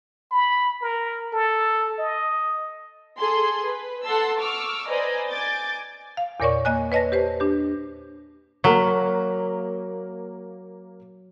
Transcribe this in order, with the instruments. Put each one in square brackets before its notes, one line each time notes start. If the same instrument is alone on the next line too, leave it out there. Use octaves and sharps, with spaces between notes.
[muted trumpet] B5
A#4
A4
D#5
[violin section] G#4 A4 C6
B4
A4 F#5 A5 C6 E6
C#6 D6 E6 F6
B4 C5 D5 D#5 G#5 A#5
G#5 D6 G6 A6
[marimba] F5
E2 A#2 A#4 C#5 D5 C#6
A#3 D#5 G#5 F#6
B4 C#5 D#5 A5 A#6
G4 B4 C5
D4 G4
[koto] F#3 [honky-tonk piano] A#3 A#4 B6